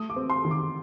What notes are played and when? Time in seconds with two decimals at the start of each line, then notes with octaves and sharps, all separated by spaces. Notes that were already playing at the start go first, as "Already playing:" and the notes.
Already playing: A3 D#6
0.10 D6
0.16 C4
0.30 C6
0.45 D#3
0.51 D6